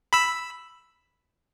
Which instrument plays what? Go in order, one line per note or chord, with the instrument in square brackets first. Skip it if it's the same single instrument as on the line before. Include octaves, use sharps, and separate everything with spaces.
[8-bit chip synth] B5 E6